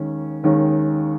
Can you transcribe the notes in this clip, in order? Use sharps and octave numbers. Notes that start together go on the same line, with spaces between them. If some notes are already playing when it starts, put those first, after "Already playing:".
Already playing: D#2 D#3 G#3 C#4
D#2 D#3 G#3 C#4